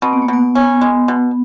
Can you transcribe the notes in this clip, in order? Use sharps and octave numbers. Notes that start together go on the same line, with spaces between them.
B2 C4
B3
A#3
B2 B3
C#4
G#3
B2